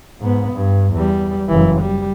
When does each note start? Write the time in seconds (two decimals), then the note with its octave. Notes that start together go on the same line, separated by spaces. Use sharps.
0.20 G#2 B3
0.53 G2
0.93 E2 G3
1.48 F#1 E3
1.81 G3